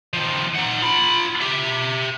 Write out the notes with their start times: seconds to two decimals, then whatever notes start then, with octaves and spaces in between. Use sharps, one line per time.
0.13 D#3 F3
0.55 D#4 F#5
0.82 F4 B5
1.41 G4 E5